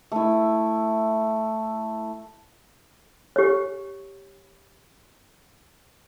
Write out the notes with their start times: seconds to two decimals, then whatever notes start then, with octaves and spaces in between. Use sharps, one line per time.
0.12 A3 E4
3.36 G4 C#5